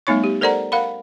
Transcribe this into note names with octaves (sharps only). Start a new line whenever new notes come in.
G3 A3 B3 D#4 C#5 C#6
G4
A4 A#4 C5 D5 F#5 A#5
A#4 F5 F#5 B5